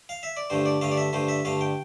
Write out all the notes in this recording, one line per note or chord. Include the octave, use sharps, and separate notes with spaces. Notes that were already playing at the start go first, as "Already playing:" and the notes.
F5
E5
D5
G2 D3 A3 C5
D5
G2 D3 A3 F5
D5
E5
G2 D3 A3 C5
E5
G2 D3 A3 F5
G5